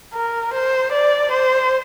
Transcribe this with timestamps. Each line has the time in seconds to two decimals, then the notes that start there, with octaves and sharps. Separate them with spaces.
0.14 A#4
0.53 C5
0.92 D5
1.31 C5